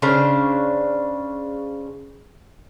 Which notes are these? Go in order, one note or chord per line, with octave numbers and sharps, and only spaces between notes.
C#3 D4 C5 C#5